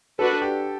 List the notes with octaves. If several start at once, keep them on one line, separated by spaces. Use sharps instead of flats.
D4 F#4 A4 B4
G4